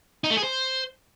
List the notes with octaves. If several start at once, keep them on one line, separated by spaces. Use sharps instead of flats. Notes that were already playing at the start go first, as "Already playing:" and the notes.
D#4
A3
G#4
C5